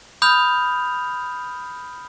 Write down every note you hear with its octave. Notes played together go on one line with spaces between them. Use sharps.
B5 D#6 F6 G6 F7